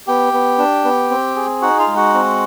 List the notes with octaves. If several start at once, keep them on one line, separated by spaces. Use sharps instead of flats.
B3 G4 G5
B3
D4
B3
C4
G#4
D#4 F#4 F#5
F4 F5
G#3
F#4 F#5
C4